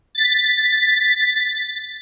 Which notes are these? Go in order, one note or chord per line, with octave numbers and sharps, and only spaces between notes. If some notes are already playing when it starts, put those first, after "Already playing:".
A6 B6